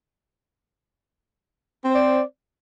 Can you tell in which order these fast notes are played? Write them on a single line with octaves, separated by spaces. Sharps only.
C4 C5 D5